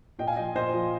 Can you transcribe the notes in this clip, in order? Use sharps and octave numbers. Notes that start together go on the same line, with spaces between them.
A#2 D#5 G5
F5 G#5
F3 D#5 G5
A#2 C5 D#5
F3